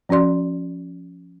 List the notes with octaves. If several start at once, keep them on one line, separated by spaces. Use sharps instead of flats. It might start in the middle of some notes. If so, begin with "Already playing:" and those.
F3 C#4 F#4 D5 C6